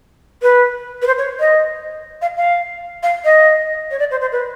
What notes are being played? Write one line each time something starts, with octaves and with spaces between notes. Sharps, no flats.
B4
B4
C5
C#5
D#5
F5
F5
F5
D#5
C#5
D5
C5
C5
B4